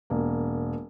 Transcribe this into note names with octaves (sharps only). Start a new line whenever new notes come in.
E1 A#3